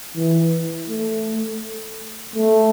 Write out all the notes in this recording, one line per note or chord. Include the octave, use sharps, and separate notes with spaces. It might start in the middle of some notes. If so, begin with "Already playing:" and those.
E3
A3
A3